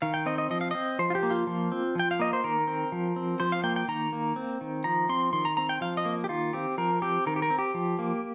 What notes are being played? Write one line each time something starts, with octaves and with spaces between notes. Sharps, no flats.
D#3 F5
G5
C4 D#5
D#5
F3 D#5
F5
C4 D#5
F3 C5
F4
G4
A#3
F4
F3
C4
F3 G5
F5
A#3 D#5
C5
D#3 A#4
C4
F3
C4
F3 C5
F5
A#3 G5
G5
D#3 A#5
A#3
C4
D#3
F3 A#5
C4 C6
D#3 C6
A#5
C4 A#5
G5
F3 F5
D#5
A#3
G4
D#3 F4
C4 G4
F3 A#4
C4 G4
D#3 A#4
G4
A#4
C4
G4
F3
A#3